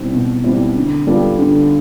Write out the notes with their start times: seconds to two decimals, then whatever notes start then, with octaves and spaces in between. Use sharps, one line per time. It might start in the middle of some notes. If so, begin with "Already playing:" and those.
Already playing: B2 G3 C4 E4
0.13 B2
0.44 G3 C4 E4
0.76 D3
1.07 G3 B3 F4 A4
1.38 D3